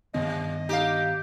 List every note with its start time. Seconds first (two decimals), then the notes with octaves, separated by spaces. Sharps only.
0.14 G2 C3 D#3 B3 D#5
0.69 D#4 G4 F5